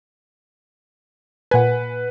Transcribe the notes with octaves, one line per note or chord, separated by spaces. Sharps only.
A#2 B4 F#5 G#5